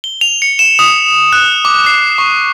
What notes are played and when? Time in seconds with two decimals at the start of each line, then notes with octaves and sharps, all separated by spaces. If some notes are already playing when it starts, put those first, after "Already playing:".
0.04 G7
0.21 F7
0.42 C#7
0.59 E7
0.79 D#6
1.33 F#6
1.65 D6
1.86 C7
2.18 C#6